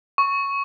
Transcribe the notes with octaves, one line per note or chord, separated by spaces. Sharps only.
C#6